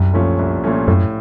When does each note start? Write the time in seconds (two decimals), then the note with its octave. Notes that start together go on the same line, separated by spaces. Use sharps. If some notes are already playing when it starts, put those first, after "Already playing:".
Already playing: C2 F#2
0.13 A#2 F3 A3 C#4
0.39 C2
0.64 A#2 F3 A3 C#4
0.88 F#2 A2